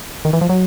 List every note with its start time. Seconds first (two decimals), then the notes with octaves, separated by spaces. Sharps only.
0.25 D#3
0.33 E3
0.41 F3
0.49 F#3